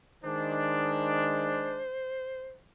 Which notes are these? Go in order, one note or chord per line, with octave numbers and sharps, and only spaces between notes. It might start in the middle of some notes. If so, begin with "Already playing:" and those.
D#3 G#3 D4 C5